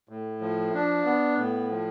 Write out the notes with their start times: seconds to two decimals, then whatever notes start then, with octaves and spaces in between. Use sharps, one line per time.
0.09 A2
0.41 F3
0.74 D4
1.06 B3
1.37 A2
1.71 F3